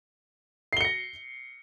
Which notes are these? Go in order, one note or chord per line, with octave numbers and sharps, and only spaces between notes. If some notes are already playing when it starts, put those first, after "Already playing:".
A#6 C7 C#7 G7